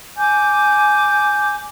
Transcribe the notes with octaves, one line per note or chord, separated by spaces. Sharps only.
G#5 D6 G6